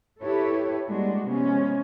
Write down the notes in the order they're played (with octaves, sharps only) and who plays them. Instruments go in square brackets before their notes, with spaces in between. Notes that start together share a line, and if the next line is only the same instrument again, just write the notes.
[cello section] E4 G4 A4 B4 C#5
G3 G#3 A#3 D4 F#4
C3 F3 G#3 B3 C#4